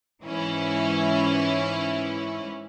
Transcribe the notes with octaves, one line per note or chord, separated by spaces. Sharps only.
G#2 E3 C#4 E4